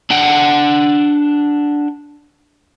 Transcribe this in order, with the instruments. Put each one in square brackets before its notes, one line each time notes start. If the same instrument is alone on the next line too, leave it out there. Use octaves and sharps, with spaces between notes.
[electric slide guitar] D4 F#5 G5